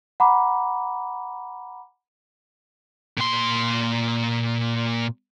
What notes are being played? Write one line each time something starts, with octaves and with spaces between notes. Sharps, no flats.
F#5 A#5 B5 D6
A#2 C6